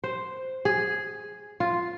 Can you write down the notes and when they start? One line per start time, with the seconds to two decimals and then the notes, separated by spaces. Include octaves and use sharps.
0.04 C5
0.65 G#4
1.60 F4